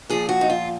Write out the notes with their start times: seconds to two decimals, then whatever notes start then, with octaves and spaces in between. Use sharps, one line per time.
0.09 A#2 F3 G#4
0.29 F#4
0.41 D#4
0.50 F4